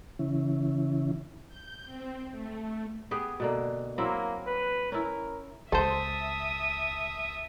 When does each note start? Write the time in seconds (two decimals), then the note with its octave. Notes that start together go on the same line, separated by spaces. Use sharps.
0.19 C#3 E3 C#4 E4
1.48 G6
1.85 C4
2.31 A3
3.11 B3 G4 G#4
3.40 B2 D3 A#3
3.98 F#3 A#3 C4 E4
4.47 B4
4.92 C#4 E4 A#4
5.72 C#2 A4 C5 E5 A5 D#6